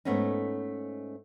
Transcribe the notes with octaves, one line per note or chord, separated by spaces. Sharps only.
G#2 A3 B3 C#4 D#4